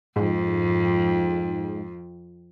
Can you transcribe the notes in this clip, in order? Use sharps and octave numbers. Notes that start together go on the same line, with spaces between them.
F2 G#2